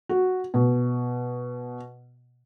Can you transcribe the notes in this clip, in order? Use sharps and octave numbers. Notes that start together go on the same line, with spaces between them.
F#4
B2